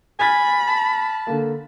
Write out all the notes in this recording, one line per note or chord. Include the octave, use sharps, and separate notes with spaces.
G#5 B5 F6 A6 B6
A5
D3 A#3